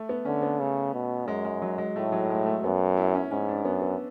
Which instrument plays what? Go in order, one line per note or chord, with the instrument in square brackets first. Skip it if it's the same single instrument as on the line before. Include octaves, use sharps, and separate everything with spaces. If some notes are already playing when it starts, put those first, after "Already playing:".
Already playing: [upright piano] A3
B3
[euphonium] D3 [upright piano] C#4
[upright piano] B3
[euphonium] C#3 [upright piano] A3
[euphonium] B2
[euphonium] F#2 [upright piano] G#3
[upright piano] G#3
F#3
G#3
[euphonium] A2 [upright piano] A3
[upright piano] F#3
G#3
A3
[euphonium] F#2 [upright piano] B3
[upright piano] E4
C#4
[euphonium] G#2 [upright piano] C#4
[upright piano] D4
[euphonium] F#2 [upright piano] B3
[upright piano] B3